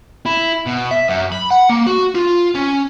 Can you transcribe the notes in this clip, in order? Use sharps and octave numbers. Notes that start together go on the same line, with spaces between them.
E4
B2
E5
F#2
B5
F#5
A#3
F#4
F4
C#4